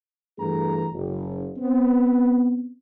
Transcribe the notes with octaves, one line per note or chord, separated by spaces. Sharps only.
G2 E3 A3 G#4 A#5
F#1
B3 C4